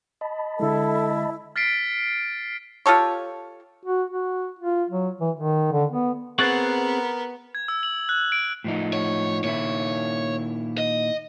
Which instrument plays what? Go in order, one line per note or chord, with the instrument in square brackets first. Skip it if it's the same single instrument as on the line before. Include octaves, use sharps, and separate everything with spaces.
[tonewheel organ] D#5 A5 B5
[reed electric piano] D3 G#3 [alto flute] E4 [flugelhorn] A4
[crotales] F6 A6 B6 C7 D7
[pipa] F4 G4 A4 C#5
[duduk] F#4
F#4
F4
F#3
E3
D#3
D3
B3
[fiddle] B3 [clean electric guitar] C4 G#4 F#5 [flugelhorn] A#4 [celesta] C#6 F#6 A6
[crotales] G#6
E6
F#7
F#6
D7
[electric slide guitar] A2 F3 D#4
[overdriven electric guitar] C#5
[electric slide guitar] A#2 D#3 E4 [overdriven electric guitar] C#5
[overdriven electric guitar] D#5